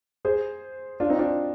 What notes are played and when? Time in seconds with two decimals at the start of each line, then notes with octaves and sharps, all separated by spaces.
0.25 G#4 C5
1.00 D4 F4
1.10 C4 D#4
1.19 D4 F4